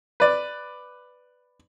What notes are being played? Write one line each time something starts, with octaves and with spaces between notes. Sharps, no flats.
B4 D5